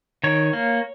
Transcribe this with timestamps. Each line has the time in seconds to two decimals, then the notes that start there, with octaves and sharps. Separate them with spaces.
0.23 D#3 C#5
0.53 A#3